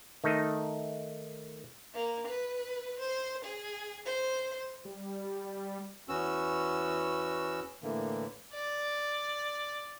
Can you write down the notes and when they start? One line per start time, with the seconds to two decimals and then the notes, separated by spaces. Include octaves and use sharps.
0.24 D#3 A3 D#4
1.93 A#3
2.26 B4
2.98 C5
3.44 G#4
4.05 C5
4.85 G3
6.09 E2 B3 C#4 F#4 E6
7.83 A2 D3 E3 A#3
8.53 D5